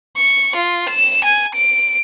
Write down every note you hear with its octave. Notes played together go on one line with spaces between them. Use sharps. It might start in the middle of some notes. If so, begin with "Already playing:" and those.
C#6
F4
E7
G#5
D7